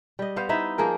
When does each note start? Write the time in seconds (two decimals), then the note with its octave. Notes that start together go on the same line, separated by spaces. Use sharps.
0.19 G3 D#5
0.36 B3 C5 F5
0.49 D#4 E4 E5
0.78 F3 A#3 G#4 A#4